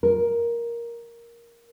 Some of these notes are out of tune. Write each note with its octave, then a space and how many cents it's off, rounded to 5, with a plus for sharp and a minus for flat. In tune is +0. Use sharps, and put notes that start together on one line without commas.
A#4 +5